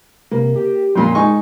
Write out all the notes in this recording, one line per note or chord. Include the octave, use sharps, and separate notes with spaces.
C3 A#3
G4
F2 A#2 C6
G#3 D#4 G#5 C#6